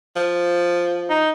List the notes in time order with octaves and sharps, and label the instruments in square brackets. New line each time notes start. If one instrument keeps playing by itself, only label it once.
[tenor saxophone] F3
[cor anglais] D#4